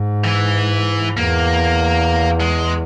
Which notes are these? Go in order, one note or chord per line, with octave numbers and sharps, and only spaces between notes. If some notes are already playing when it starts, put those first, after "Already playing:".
Already playing: G#2
E3
E2 A#3
G#3